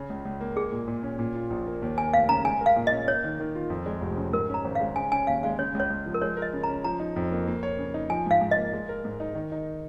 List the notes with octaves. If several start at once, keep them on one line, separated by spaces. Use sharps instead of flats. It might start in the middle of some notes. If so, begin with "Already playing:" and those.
Already playing: C#3 C#4
C#2
C#2
A#3
G#3 G#4
A#2
A#2
C#4
A#2
F4
A#1
A#3
D#2
A#3 G#5
F1 F5
C#3 A#5
G#3 G#5
A#4
F5
A#2
C#4 D#5
A#3 C#5
D#3
D#3
F4
F2
G#3
F1
C#3
G#2 A#4
C#4 A#5
G#1
G#3 F5
C#3 G#5
C#4 G#5
D#2 F5
G#3 F5
C#3 C#5
C#2
C#5
C#2
F3
A#4
G#3 C#5
A#4
D#5
C#3
A#5
C#4
F3 A#5
D#4
F2
A#3
A#3
C#5
C#3
D#4
F3 G#5
G#2 F5
G#2
D#5
A#3
G#3
A#4
G#2
D#4
D#3
D#4